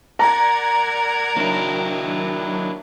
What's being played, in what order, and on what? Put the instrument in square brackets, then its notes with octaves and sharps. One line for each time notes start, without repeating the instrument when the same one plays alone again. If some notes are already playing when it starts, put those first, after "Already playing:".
[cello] A#4 [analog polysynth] D5 F#5 G#6 [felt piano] A#5
[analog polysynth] D#3 F#3 D4 [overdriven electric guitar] A#3 E4